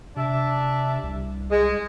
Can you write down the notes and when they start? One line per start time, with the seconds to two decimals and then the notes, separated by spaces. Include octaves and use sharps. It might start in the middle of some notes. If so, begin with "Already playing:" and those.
0.16 C3 D4 E5
1.03 C2
1.51 G#3